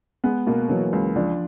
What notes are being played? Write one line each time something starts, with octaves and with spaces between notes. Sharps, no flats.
G#3 B3
B2 A#3
E3 F#3
C#2
F3 D4